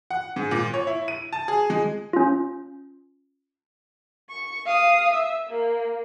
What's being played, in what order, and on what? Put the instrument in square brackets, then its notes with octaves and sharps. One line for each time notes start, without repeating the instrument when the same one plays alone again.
[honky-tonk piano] F#5
G#2
A#2
C#5
E4
D#7
A5
G#4
G#3
[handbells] C#4 F4
[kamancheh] C#6
F5 D#6
E5
A#3